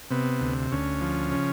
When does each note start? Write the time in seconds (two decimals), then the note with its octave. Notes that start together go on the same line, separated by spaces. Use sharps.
0.11 C3 B3
0.40 D2
0.72 D2 C#4
1.01 F3
1.31 C#3